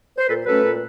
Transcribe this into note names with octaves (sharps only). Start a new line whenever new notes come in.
C5
A#2 A4 B4
F#3 A3 C#4 A4 B4
A#2